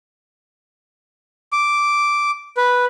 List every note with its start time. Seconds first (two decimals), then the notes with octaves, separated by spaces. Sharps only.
1.52 D6
2.57 B4